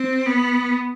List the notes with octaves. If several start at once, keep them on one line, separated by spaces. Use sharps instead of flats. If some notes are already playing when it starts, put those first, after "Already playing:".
Already playing: C4
B3